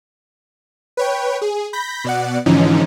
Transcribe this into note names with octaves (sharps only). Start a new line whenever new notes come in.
B4 C#5 G5
G#4
B5 G6 A#6 B6
B2 D5 F#5
G#2 D3 E3 F3 C#4 D#4